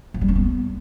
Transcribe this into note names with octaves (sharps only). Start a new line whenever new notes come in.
F3
G3
C#4
B3